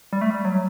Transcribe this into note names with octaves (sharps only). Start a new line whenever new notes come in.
G3
A3
G3
F#3